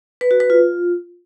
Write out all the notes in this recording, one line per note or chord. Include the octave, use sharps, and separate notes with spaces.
B4
F#4
B4
F4